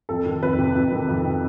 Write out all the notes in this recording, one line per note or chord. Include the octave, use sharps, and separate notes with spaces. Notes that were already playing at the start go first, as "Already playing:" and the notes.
F2 A4
D#3
F2 B4
C3
F2
D#3
F2
C3